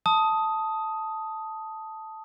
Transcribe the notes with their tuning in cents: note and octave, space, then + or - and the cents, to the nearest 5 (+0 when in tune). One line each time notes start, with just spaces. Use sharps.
A5 +0 D#6 +5